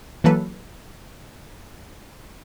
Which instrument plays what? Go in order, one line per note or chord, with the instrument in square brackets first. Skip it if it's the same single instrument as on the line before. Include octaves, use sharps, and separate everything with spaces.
[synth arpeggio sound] E3 F#3 A#3 A4 B4